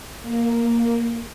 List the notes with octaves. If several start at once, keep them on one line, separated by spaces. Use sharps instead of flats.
A#3